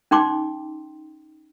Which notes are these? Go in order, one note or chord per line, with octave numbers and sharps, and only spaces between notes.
C#4 D#4 G5 C6 D6